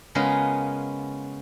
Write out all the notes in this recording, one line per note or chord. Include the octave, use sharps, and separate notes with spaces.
C#3 G#3 B3 C#4 F4 A#4